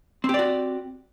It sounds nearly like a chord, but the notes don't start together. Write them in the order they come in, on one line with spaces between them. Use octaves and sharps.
C4 G4 D5 F#4